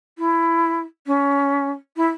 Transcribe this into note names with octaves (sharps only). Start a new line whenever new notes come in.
E4
C#4
E4